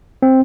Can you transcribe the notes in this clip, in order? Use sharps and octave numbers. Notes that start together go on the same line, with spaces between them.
C4